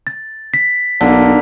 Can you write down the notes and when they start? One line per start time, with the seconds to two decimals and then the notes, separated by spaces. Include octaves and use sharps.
0.07 A6
0.54 B6
1.01 B1 D3 A#3